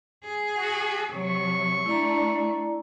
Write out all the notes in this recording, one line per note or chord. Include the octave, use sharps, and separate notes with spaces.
G#4
F#4
C3 F#3 C#6
A3 D4 E4 D5 A#5